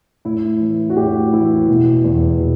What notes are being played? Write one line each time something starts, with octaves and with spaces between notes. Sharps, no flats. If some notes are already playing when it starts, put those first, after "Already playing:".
A2 E4
E3
F#4
A2 G4
E3 E4
B2
E2
B2